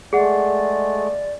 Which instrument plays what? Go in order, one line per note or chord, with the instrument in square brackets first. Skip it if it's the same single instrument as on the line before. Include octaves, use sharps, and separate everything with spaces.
[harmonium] G#3 A3 [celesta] G#4 F#5 [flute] D5